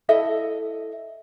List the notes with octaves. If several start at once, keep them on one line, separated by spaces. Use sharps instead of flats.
E4 A4 D#5 E5